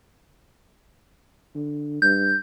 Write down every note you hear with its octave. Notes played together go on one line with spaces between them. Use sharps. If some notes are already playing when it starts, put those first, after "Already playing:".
D3
G2 G6